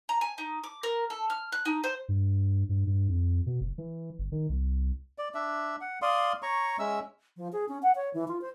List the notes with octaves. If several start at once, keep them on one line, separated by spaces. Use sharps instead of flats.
A#5
G#5
D#4
D6
A#4
A4
F6
F#6
D#4
C5
G2
G2
G2
F2
B2
F#1
E3
G1
D#3
C2
D5
D4 E5
F#5
D5 F5 C6 D#6
C#5 A#5 C#6
G#3 C#4 E5 E6
F3
G#4
C#4
F#5
C#5
E3
F4
C5